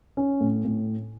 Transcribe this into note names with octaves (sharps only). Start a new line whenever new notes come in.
C#4
A2
A2